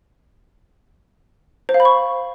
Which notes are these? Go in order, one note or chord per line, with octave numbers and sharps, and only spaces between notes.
C5
F5
B5
C#6